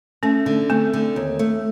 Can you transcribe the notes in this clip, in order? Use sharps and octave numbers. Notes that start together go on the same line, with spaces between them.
A3 C#4
D3
A3 C4
D3
D#2
A3